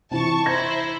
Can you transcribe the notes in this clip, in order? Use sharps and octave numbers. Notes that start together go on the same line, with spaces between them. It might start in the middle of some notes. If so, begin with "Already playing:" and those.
C3 E3 A5 C#6
E4 C5 A#5 G#6 A#6